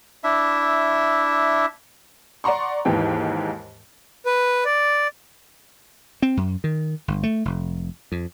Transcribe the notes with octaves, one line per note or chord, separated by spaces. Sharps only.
D4 E4 E5
D5 F#5 A#5 C6 C#6
D#2 G#2 E3 G5
B4
D5
C4
F#2
D#3
G1
A3
F1
F2